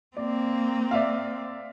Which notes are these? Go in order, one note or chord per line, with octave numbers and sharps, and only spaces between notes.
A#3 C4 D5
D5 E5 F5